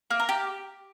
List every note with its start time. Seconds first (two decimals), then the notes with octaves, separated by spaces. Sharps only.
0.10 A#3
0.20 A#4
0.29 G4